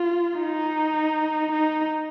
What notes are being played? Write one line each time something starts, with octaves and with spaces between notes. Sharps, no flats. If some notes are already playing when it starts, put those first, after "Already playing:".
Already playing: F4
D#4
D#4